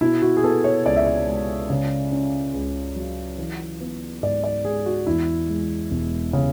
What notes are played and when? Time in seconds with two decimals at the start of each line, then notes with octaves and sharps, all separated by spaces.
0.01 B2 E4
0.22 F#4
0.37 G#4
0.44 B3 A4
0.64 C#5
0.86 C#2 D5
0.96 E5
1.07 D5
1.27 G#3
1.70 C#3
2.12 C#4
2.54 C#2
2.96 F#3
3.38 E3
3.80 B3
4.23 G#2 D5
4.44 D5
4.65 G#3 G#4
4.86 F#4
5.07 E2 E4
5.49 G#3
5.91 E1
6.33 C#3